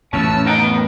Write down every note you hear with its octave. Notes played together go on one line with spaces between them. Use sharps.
A1 F2 C#4 A5 E6
D#4 A#4 F#5 G5
B3